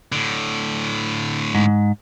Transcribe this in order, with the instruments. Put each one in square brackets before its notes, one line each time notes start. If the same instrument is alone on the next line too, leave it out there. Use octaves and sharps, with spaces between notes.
[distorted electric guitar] A2 D3
[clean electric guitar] G#2